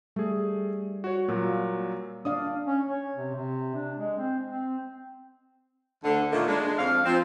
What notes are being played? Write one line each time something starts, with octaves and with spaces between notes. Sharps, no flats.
G3 A3 G#4
F#4 C#5
A#2 F#3 A#3
D4 D5 F5 D#6
C#4
C#5
C3
C3
D4
G#3
C4
C4
D2 D3
A#2 D#3 A3 A#3
G#3 D4
F2 F5
F3 C4